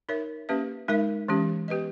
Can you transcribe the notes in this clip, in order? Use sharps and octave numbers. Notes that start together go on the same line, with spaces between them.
D#4 A#4 C#5 E5
A#3 C#4 G4 B4 E5
G#3 D#4 A#4 E5
E3 G#3 C#4 G4
B3 G4 B4 D#5